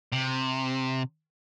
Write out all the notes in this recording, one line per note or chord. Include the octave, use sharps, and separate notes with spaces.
C3